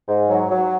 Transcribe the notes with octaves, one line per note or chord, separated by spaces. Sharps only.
G#2
F#3
F#3